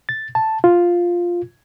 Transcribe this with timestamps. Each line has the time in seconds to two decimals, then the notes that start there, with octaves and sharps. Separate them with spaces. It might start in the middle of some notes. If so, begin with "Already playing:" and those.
0.09 A6
0.35 A5
0.64 F4